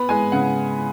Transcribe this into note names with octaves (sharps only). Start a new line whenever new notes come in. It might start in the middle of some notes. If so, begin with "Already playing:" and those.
Already playing: B3 B5
G#3 G#5
C#3 F#5